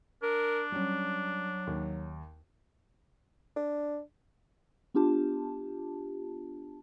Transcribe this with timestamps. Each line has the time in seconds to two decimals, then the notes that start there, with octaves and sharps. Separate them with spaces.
0.23 D4 A#4
0.72 F#3 G3 C#4
1.67 D#2
3.56 D4
4.94 B3 D4 F4 G4 A5